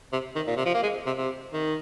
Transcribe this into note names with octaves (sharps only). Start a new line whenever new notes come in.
C3
D#3
A#2
C3
F3
A#3
G#3
C3
C3
D#3